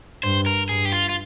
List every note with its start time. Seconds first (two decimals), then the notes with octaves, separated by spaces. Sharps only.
0.23 G2 C5
0.46 A#4
0.69 G2 G#4
0.85 G4
0.92 F4
1.09 F4